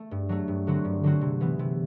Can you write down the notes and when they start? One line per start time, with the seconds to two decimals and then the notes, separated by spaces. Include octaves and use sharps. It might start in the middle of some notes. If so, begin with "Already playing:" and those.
Already playing: A3
0.11 G2
0.29 F#3 A3
0.48 G2
0.67 D3 F#3 C4 F#4
0.84 G2
1.03 D3 F#3 C4 F#4
1.21 C3
1.41 E3 B3
1.59 C3